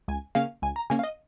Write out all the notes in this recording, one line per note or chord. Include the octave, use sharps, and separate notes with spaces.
C#2 G#5
C#3 A#3 C#4 F5
C#2 G#5
A#5
C#3 A#3 C#4 G#5
F5
D#5